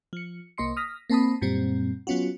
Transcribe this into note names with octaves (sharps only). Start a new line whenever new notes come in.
F3 C#7
C2 A#3 D#5 C6 C#7
D#6 F6 A#6 B6
A#3 C4 A5 B5 D#6
F#2 A#2 G3 C4
F#3 B3 C#4 F4 F#4